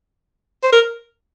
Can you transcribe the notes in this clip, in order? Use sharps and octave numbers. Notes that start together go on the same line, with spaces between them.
C5
A#4